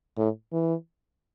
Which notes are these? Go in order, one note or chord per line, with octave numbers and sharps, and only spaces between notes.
A2
E3